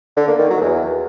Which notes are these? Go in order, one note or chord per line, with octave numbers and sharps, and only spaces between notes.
D3
A#3
D#3
F#3
E2